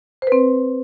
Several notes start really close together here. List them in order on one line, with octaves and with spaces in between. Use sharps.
C5 B4 C4